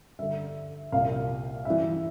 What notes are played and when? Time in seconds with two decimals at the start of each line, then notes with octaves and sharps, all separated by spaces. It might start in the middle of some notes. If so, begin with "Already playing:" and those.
0.19 G2 D3 E5
0.92 C2 A#2 F5
1.65 G2 E3 E5